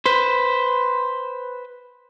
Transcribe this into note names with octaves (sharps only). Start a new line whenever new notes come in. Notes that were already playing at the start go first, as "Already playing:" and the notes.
B4 C5